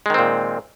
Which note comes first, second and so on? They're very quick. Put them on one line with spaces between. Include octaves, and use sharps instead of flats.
G#3 D#3 C4 A#2